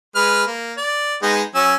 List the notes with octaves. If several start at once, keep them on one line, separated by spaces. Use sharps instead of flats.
G#3 B4 F6
A#3
D5
G#3 B3 D#4
F#3 C#4 E6